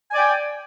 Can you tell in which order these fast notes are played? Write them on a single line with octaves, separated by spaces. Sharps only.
G#5 D5 G5